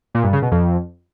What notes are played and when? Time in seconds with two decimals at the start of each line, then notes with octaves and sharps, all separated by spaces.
0.14 A#2
0.24 G2
0.33 C#3
0.42 B2
0.51 F2